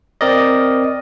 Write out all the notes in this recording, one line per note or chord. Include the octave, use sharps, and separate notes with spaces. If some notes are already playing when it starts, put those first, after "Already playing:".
C4 A#4 D5 D#5